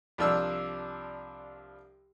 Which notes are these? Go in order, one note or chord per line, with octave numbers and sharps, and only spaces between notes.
C2 F3 D4 E6